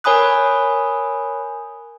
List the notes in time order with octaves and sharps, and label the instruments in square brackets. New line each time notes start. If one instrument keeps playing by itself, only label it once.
[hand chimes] A#4 C#5 G#5 B5 D#6 F#6